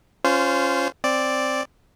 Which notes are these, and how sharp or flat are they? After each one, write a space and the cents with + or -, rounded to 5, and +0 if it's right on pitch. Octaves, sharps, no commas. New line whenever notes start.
C#4 +0 F4 +0 C5 -20
C4 +5 D5 +0